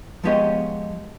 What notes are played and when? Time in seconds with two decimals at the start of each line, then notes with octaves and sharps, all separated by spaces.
0.24 F3 G#3 B3 G4 C#5 D#5